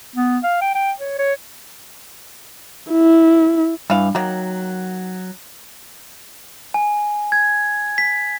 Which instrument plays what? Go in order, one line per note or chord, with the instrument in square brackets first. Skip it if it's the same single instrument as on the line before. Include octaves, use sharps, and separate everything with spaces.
[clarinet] B3
F5
G5
G5
C#5
C#5
[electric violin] E4
[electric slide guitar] G2 [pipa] E3 F5
[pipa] D#3 A#3 [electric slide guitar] F#3
[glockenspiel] G#5
G#6
B6